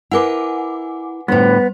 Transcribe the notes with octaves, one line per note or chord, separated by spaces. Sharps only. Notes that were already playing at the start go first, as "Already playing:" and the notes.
E4 A#4 B4 F#5 G#5 D6
A2 D3 G3 B3 B4 C5